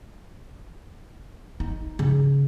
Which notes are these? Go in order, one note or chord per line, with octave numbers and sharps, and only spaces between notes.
D#4
C#3